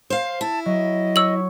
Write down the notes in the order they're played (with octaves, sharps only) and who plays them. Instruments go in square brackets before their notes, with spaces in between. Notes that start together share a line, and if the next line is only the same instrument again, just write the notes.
[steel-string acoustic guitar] C5 F5
[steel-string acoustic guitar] E4 [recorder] A5
[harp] F#3 [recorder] D#5
[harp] C#5 [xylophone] E6 F#7